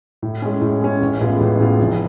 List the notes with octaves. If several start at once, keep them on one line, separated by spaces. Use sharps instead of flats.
A2
G#3 C#4
A2
G#3 C#4
A1
A2 G#3 B3 F4
A1
A2 G#3 B3 F4
F1